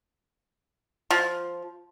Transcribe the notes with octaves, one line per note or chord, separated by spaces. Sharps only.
F3